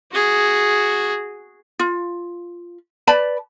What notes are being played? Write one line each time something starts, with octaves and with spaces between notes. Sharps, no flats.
F#4 G#4
F4
B4 D5 A5 B5